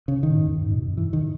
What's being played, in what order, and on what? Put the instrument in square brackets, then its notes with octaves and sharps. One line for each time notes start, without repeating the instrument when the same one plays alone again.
[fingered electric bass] C#3
D#3
[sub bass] A#2
G#2
E2
F#2
G#2
A#2
B2
F#2
[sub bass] G#2 [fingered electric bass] E3
[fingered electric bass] D#3